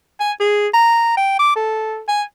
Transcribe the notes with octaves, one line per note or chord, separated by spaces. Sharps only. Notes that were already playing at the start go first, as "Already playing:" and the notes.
G#5
G#4
A#5
G5
D6
A4
G#5